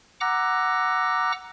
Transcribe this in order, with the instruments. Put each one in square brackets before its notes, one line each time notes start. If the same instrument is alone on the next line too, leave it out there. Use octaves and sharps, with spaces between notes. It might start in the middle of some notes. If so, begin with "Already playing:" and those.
[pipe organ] F#5 A#5 D6 E6 F#6 A#6